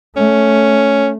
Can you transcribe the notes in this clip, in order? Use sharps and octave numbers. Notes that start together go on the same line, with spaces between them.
A3 C#4